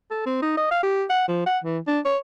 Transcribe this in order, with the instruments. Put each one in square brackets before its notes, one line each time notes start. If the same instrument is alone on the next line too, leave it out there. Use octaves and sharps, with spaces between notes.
[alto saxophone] A4
C4
D#4
D#5
F5
G4
F#5
F3
F#5
E3
D4
C#5